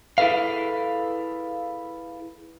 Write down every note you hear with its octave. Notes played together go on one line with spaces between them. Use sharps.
E4 G#4 A4 B4 F5